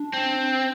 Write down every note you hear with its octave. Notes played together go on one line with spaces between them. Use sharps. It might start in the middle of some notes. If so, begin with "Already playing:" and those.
Already playing: D4
C4